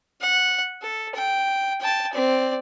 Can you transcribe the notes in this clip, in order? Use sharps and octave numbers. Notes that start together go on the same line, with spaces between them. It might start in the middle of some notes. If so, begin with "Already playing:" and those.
F#5
A4
G5
G5 A5
C4 D5